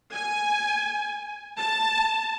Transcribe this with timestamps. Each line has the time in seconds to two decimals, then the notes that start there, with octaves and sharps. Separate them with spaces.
0.13 G#5
1.58 A5